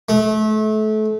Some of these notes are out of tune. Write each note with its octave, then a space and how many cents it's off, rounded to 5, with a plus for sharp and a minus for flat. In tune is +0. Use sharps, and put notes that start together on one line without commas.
A3 -30